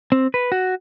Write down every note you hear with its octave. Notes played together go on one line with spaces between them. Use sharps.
C4
B4
F#4